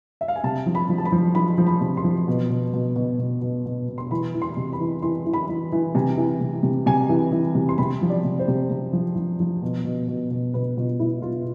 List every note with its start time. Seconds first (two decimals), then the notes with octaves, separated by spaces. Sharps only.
0.21 E5
0.28 F5
0.36 G#5
0.44 C3 A5
0.66 F3
0.75 B5
0.89 F3
0.98 A5
1.05 B5
1.12 F3
1.35 F3 B5
1.58 F3
1.67 B5
1.81 C3
1.97 C6
2.04 F3
2.28 B2
2.50 B2
2.73 B2
2.96 B2
3.19 B2
3.41 B2
3.66 B2
3.88 B2
3.98 C6
4.11 E3 B5
4.35 E3
4.42 C6
4.57 C3
4.73 B5
4.80 E3
5.02 E3 C6
5.26 E3
5.33 B5
5.48 E3
5.72 E3
5.95 C3 G#5
6.17 E3
6.41 C3
6.63 C3
6.86 C3 G#5
7.09 E3
7.32 E3
7.55 C3
7.69 C6
7.78 C3 B5
8.02 F3
8.10 D5
8.24 C3
8.39 C5
8.48 C3
8.70 C3
8.93 F3
9.15 F3
9.40 F3
9.62 B2
9.85 B2
10.08 B2
10.31 B2
10.54 B2 B4
10.77 B2 F4
10.99 B2 E4
11.22 B2 F4